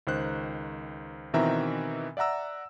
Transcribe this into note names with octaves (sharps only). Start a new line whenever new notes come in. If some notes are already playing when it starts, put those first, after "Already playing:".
C#2 D#3 C5 F#6
B2 D#3 E3 C4 E5 A#5
D5 E5 F#5 A#5 E6